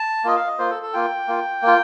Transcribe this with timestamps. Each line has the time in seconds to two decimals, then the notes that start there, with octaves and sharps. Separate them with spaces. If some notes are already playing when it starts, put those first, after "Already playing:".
Already playing: A5
0.24 A#3 F4 D#5
0.36 F5
0.47 D#5
0.59 A#3 F4 C5
0.70 A4
0.82 A4
0.93 A#3 F4 G5
1.28 A#3 F4
1.62 A#3 F4